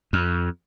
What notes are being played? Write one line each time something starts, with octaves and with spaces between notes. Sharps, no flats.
F2